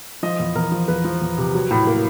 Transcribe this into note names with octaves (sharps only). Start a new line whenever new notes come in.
F3 D#5
E2
E2 A#4
F3
E2 B4
F3
E2
C3
F#3
A2
A#3